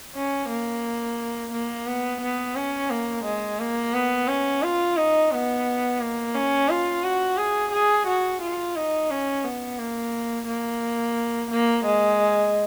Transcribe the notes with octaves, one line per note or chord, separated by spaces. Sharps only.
C#4
A#3
A#3
B3
B3
C#4
A#3
G#3
A#3
B3
C#4
F4
D#4
B3
A#3
C#4
F4
F#4
G#4
G#4
F#4
F4
D#4
C#4
B3
A#3
A#3
A#3
G#3